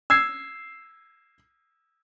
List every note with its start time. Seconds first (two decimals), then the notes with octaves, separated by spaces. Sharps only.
0.10 E6 G#6 C7